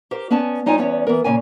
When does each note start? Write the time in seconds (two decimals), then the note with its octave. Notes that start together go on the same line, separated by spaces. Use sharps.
0.11 G4 A#4 C5
0.31 B3 C#4 D5 A5
0.66 G3 D#4 F4 C#5 G#5
0.78 E2 G3 B3 C#4 C#5 D5
1.07 E3 B3 A#4
1.24 A#2 C#3 G#5